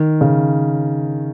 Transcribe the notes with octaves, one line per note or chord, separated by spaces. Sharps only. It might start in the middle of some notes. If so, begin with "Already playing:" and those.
Already playing: D#3
C#3